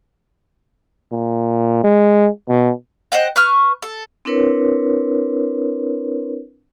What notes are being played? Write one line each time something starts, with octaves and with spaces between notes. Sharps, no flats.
A#2
G#3
B2
C5 D#5 F#5 G5
B4 C#6 F6
A4
C4 D4 E4 A#4 B4 C#5